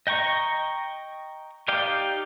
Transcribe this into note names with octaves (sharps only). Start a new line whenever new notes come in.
D#5 G5 A#5 C#6
D#4 G4 D5 F5 G5